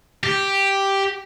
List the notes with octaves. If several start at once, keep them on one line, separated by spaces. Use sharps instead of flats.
G4